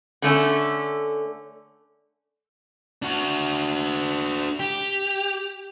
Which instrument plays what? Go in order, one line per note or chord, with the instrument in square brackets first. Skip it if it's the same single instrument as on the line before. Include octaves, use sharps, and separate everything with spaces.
[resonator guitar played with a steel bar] D3 A3 C#4
[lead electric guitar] D4 F#4
G4